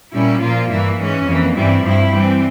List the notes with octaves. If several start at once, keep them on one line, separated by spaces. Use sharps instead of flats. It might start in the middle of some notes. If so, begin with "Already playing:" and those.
A#2 G3 C#4 E4
A#2 F3 A#3 F4
G2 E3 A#3 E4
G#2 E3 G#3 C#4
F2 E3 A#3
G2 E3 G3 C4 E4
G2 F3 C4 E4
E3 G3 C4